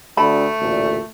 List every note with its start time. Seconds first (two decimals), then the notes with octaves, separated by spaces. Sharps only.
0.17 D2 A3 A5 B5
0.59 A1 D2 A#2